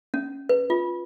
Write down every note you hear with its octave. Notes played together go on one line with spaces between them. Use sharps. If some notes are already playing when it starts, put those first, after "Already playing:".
C#4
B4
F4